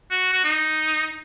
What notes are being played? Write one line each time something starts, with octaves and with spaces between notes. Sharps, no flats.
F#4
F#4
D#4